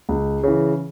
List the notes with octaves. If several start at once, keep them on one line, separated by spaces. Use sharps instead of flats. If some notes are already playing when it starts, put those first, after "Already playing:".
C#2
C#3 E3